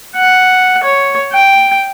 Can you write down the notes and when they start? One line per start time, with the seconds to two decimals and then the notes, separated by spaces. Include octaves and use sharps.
0.16 F#5
0.84 C#5
1.33 G5